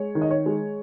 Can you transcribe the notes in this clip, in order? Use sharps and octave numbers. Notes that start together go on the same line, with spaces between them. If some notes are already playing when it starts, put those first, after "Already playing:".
Already playing: G#3 C#5
D#3
D#5
C#5
G#3